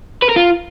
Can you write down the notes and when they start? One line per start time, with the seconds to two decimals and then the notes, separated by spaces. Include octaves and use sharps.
0.22 B4
0.29 A#4
0.36 F4